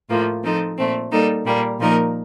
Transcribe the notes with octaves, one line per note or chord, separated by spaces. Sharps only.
A2 F3 A#3 F4
F3 C4 D#4 A4
A#2 A3 C4
G3 A#3 D#4 A4
A#2 G3 A#3
A#2 F3 A#3 D#4 A#4